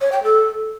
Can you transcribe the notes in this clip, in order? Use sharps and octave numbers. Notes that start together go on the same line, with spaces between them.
C#5
G5
A4